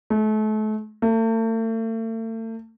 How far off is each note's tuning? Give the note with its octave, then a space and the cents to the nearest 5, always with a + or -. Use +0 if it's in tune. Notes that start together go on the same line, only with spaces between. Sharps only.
A3 -35
A3 +40